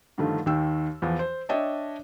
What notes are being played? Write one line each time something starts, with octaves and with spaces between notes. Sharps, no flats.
G2 D3 D#3 F3 A3
D#2 D#3 G5 E6
E2 E3 F3
C5
D4 C#5 D#5 E5 G5 A5